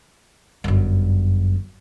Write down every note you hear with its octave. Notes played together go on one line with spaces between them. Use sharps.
G1 F#2